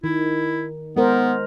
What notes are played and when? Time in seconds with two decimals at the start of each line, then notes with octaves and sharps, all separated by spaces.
0.04 D#3 E4
0.96 G#3 B3 A#4 C5